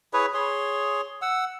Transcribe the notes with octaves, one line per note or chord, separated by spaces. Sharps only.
E4 G#4 B4 C#5
G#4 C#5 C6
F#5 E6